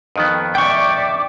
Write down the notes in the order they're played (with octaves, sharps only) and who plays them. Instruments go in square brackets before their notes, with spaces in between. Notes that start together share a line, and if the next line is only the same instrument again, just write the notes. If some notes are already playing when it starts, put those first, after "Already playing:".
[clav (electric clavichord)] F2 D#3 B3
[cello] D5 E5 [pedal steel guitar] G5 C#6 [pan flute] D6